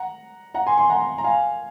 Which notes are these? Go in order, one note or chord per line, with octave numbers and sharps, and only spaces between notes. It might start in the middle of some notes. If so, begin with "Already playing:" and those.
Already playing: F#5 A#5
F#5 A#5
G#5 C6
G#5 C6
F#5 A#5
A#5
F5 G#5